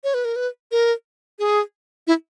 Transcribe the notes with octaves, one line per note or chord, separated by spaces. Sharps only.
C#5
B4
A#4
B4
A#4
G#4
E4